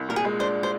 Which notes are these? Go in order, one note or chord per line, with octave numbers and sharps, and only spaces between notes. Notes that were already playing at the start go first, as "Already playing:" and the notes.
Already playing: C2
A#2 A#4
G#4
G#3
D4 C5
C5